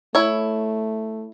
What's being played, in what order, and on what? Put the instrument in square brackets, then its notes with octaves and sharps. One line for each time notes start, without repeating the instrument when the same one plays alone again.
[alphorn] A3 [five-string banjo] E4 C#5